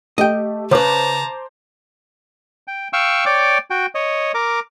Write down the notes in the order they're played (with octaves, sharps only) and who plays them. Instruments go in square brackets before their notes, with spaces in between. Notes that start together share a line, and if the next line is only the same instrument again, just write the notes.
[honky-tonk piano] A3 G4 [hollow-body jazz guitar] D#5 G5
[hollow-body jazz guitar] C#3 B4 [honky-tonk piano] C5 D6 [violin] A5 A#5
[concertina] G5
F5 G5 C#6 E6
C#5 D5 G5 D6
F#4 G5
C#5 D#5
A#4 D6